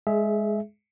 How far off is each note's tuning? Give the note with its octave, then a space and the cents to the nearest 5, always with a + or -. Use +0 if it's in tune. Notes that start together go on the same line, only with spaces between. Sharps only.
G#3 +0 G#4 +25 E5 +0